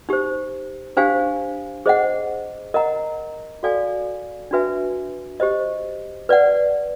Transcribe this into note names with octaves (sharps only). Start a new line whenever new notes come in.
D#4 G4 C5
D4 G4 C5 F5 G#5
G#4 C5 D#5 F#5
A#4 D#5 F#5 A#5
F#4 A4 D5 F5 G#5
D4 F#4 B4 E5 G#5
G4 C5 D#5
B4 D5 F#5